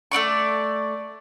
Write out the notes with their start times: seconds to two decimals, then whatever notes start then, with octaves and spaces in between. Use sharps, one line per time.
0.12 A3 E4 D5 C#6